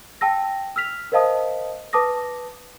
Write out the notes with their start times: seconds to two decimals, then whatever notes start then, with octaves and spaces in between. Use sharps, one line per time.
0.21 G5 A5 E6 A#6
0.76 E6 F6 B6 F7
1.12 A#4 C5 D#5 F5 A5 D#6
1.93 B4 A5 D6 D#6 A#6